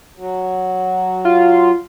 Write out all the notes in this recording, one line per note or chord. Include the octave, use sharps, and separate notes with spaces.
F#3
F4